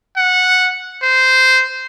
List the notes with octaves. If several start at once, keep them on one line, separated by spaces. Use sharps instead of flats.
F#5
C5